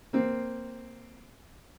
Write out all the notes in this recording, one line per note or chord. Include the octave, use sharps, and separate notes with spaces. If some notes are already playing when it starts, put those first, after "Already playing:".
A#3 C4